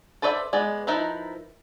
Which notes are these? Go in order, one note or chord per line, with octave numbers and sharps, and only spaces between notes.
A4 B4 C5 D5 E5
G#3 B3 D5
F3 D#4 E4 A#4 B4